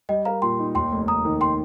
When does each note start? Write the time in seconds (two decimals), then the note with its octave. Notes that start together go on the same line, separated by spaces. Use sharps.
0.09 G3 D#5 G5
0.25 A#4 F5 A#5
0.42 A#2 G5 C6
0.59 D#4
0.75 D#2 G5 C6
0.91 F1
1.08 F1 A#5 D#6
1.25 D#3
1.41 G5 C6